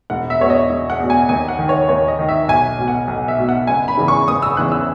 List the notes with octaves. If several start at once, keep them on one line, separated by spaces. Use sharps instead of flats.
E1 F#5
E5
E2 B2 C#5
D#5
E1
F#5
E2 B2
G#5
D#2 G#5
F#5
D#3
C#5
D#2 C#5
D#5
D#3
E5
B1 G#5
B2
F#5
B1
E5
B2
F#5
F#1 G#5
B5
E2 C#3 E3
C#6
F#1 D#6
E6
E2 C#3 E3 F#6
E6